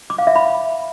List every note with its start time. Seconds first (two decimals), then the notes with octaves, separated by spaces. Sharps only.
0.10 D6
0.18 F5
0.27 E5
0.36 B5